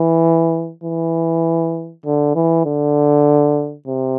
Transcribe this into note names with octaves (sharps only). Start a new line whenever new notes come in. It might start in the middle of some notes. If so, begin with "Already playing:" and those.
Already playing: E3
E3
D3
E3
D3
C3